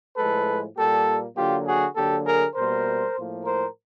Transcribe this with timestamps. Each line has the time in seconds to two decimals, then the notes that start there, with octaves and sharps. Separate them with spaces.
0.17 A2 F3 G#3 A4 B4
0.77 A#2 G3 A#3 G4 A4
1.36 D3 F#3 A#3 F4 G4
1.67 F#4 G#4
1.96 D3 F#3 A#3 G4 A4
2.26 G#4 A#4
2.55 B2 G3 A#3 A#4 C5
3.15 A2 F3 A#3
3.45 A#4 C5